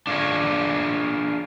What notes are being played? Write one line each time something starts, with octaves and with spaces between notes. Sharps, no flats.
D4 F4 G#4 C#5